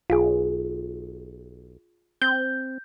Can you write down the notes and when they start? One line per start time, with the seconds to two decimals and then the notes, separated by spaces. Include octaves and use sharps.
0.10 B1 F4 G#4
2.22 C4 G6